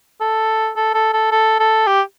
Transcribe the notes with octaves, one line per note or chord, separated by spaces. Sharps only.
A4
A4
A4
A4
A4
A4
G4